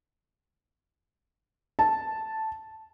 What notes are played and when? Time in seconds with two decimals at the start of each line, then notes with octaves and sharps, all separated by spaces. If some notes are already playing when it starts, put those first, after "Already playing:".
1.79 A5